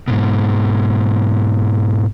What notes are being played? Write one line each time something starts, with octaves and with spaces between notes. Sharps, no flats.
G#2 B2